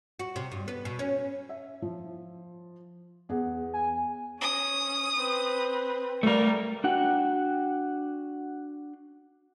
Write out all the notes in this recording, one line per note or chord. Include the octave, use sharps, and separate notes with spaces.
F#4
C3
G2
B3
B2
C#4
E5
F3
E2 G#4 F#5
G#5
C#4 D#6
C4 B4
G3 A3 A#4
D4 F#4 F#5 G5